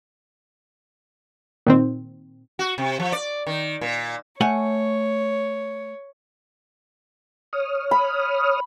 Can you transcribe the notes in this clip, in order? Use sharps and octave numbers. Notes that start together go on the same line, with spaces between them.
A#2 D#3 C4
F#4
C3
F3
D5
D#3
A#2
A3 C#5 F#5 G#5
C#5 D#6 F6
B5